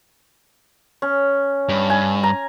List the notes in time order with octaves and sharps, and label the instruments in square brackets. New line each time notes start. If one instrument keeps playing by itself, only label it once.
[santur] C#4
[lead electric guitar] G2
[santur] G#5
A#5